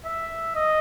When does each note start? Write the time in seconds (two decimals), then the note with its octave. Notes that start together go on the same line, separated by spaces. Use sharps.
0.05 E5
0.56 D#5